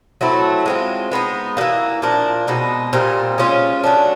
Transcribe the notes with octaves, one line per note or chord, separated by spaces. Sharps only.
F#3 A3 C4 E4
G#3 C4 F4
G#3 B3 D#4
E3 G3 A#3
A#2 F3 A#3 D4
B2 G#3 C4 D#4
A#2 G3 C4 D#4
G#3 C#4 F4
F#3 A3 D4